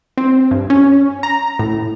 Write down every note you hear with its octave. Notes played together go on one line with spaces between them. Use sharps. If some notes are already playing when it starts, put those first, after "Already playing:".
C4
G2
C#4
A#5
A2